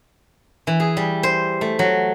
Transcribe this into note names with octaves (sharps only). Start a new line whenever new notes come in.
E3
G#4
G3
C5
A3
F#3